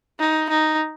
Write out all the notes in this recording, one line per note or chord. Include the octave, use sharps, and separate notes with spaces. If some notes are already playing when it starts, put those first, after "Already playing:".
D#4
D#4